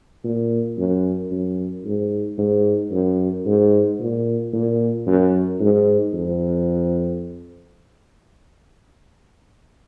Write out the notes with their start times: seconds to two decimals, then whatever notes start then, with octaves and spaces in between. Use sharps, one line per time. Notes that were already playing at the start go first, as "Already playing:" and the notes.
0.24 A#2
0.78 F#2
1.31 F#2
1.85 G#2
2.38 G#2
2.92 F#2
3.46 G#2
4.00 A#2
4.53 A#2
5.07 F#2
5.61 G#2
6.14 F2